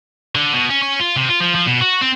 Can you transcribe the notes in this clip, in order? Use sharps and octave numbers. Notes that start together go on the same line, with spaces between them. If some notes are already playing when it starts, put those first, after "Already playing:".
D3
B2
C#4
C#4
F4
C3
F4
F3
F3
B2
F#4
C4